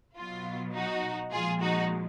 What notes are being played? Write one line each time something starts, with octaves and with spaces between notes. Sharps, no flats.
B2 F#3 F4
D#4 F#4
A#2 F3 G#3 F4 G#4
D#4 F#4